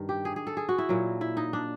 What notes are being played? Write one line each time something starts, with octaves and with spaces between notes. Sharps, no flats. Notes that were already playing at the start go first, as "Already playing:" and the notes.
Already playing: G2 D#3
G4
G#4
G#4
A4
G#4
F#4
E4
A#2 F#3
E4
D#4
D4